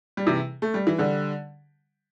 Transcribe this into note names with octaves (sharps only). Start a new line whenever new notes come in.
G3
C3 E3
A3
G3
E3
D3 G3